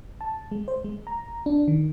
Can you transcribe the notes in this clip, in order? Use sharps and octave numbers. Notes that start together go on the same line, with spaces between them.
A5
G#3
C5
G#3
A#5
D4
D#3